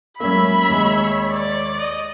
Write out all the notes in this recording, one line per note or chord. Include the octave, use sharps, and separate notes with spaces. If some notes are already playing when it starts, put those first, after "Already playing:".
A2 F#3 G#3 A#3 C#4 E5 B5
D#2 G#3 C#5
D5
D#5